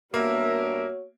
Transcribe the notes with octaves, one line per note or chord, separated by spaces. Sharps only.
G2 A#3 B3 F#4 A#4 C#5 E5